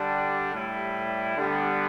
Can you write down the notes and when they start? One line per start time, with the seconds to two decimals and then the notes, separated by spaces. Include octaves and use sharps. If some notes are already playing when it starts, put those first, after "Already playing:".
Already playing: D3 G3 D4
0.54 A2 G3 E4
1.36 D3 G3 B3